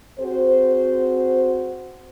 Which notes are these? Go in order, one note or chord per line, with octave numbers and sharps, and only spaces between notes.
C4 F#4 G#4 C5